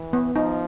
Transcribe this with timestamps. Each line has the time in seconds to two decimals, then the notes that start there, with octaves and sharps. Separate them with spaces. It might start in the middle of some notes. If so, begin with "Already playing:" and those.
Already playing: E3
0.13 B3
0.35 F3 D#4